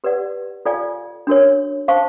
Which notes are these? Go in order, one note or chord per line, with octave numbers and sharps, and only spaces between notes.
G4 B4 D5 F#5
F4 A4 D5 F5 G#5
D4 F#4 A#4 C#5
C5 F5 A5 C#6